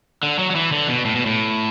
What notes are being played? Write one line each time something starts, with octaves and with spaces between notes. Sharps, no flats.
D3
F#3
F#3
E3
D3
B2
A2
B2
A2